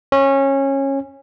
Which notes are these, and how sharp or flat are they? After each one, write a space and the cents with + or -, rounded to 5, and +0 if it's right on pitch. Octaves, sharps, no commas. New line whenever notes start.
C#4 -20